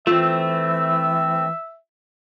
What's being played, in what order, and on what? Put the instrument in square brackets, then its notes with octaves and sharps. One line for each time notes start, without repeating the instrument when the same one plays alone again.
[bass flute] E3 [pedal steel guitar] A3 C4 [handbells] F4 [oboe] E5